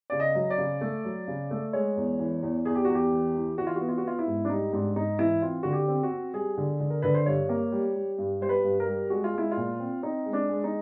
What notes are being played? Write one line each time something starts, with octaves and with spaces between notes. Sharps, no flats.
C#3 D5
D#5
F#3
D5
C#3
A3
F#3
C#3
A3
G#3 C#5
E2
E3
E2
E2 G#4
G4
E2 F#4
G4
E3
E3
E3 F#4
F4
B3 F#4
F4
F#4
B3 F4
E4
G#2
D4
G3 D#4
G#2 D4
G#2 D#4
E3 E4
C4 F4
D3 F#4
G4
C4
F#4
C4
G3 G#4
D3
D3
A#4
D3 B4
C5
G2 C#5
A#3
G3
G3
G2
G3 C5
B4
G2
A#4
G3
G#3 F#4
F4
G#3 E4
F4
A#2
C4
C4 D#4
G#3
D4
G#3
D#4